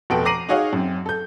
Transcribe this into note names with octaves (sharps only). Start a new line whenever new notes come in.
F1 B2 F#4 A4 G5 D7
A#5 D6 A#6 C7 D#7 F#7
D#4 F#4 G#4 C#5 D#5 F5
F#2 C4
A4 G6